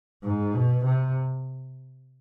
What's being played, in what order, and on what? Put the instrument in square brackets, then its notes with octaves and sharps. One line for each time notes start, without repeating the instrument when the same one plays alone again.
[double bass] G#2
B2
C3